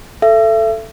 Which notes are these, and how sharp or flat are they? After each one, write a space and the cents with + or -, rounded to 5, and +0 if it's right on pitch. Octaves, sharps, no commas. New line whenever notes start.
A4 +0 E5 +35